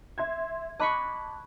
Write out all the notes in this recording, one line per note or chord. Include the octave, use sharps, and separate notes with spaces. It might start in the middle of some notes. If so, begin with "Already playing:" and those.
E5 C6 G#6
D#5 A5 B5 C#6 D6 F#6